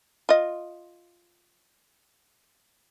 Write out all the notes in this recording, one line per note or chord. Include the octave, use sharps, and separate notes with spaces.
F4 D#5